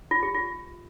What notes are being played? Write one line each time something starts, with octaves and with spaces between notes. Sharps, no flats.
F4
G4
F4